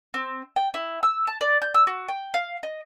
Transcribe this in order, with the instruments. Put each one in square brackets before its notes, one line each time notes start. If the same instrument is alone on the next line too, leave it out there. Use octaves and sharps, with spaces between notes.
[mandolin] C4
G5
E4
E6
A5
D5
G6
E6
F#4
G5
F5
D#5